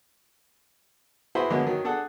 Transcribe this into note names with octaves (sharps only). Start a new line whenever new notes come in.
E4 F#4 G#4 B4 C5
D3 F#3 G#3 A#3 B3
D#3 F#3
D4 G#4 A4 F#5